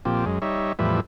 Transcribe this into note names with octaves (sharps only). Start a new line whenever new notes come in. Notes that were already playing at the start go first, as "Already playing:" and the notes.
A#2 F3 C4 G4
F#2 G#3
G3 D#4 C#5 E5
E2 A2 F3 G3 B4 E5